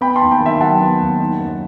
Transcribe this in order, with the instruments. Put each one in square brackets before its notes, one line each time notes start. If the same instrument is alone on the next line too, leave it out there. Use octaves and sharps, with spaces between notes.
[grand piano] B3 G5 B5
A5 C6
D#2
G5 B5
D#3
E5 G5
F#3 F#5 A5
B3
D#2
D#4
F#2